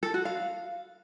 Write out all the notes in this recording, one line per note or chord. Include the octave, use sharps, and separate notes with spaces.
A4
F#4
F5